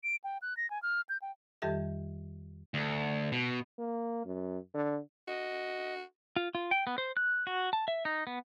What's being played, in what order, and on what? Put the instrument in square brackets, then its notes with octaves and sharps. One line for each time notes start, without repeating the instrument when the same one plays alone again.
[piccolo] D7
G5
F#6
A#6
G#5
F6
G6
G5
[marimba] F2 D#3 G3 G4 A4 E5
[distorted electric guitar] D2
B2
[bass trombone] A#3
F#2
D3
[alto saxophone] F#4 [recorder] D#5
[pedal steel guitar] F4
F4
G5
B3
C5
F#6
F#4
A5
E5
D#4
B3